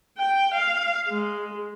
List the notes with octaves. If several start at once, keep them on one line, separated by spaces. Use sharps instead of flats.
G5
F5
G#3